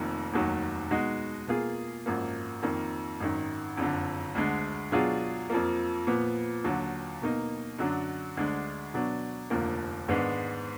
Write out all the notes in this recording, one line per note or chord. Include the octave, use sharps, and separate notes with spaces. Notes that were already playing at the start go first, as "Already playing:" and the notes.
Already playing: F1 F2 D#3 A#3
F1 D#2 D#3 F#3
B2 G#3 D#4 F#4
B2 A#3 F4 G#4
G#1 F#2 F3 A#3
F2 D#3 A#3
G#1 F#2 D#3
F#1 F2 D3
D2 D3 G#3
B2 F#3 D4 F4 G#4
F2 F3 A#3
A#2 F3 B3
D#2 D3 F#3
B2 A#3 D#4
F#2 D3 F#3 D4
D2 D3 G#3 D4
B2 F#3 D4
F1 D#2 D3 F3 A#3
G#2 D#3 G#3 B3 D4